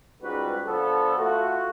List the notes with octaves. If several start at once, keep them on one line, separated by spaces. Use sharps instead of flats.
C#2 G#2 G3 F#4 B4
D3 F3 B3 A4
A3 F4 F#4